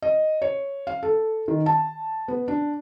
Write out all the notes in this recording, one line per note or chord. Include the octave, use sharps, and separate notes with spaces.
D#5
C#5
F5
A4
D#3
A5
B3
D4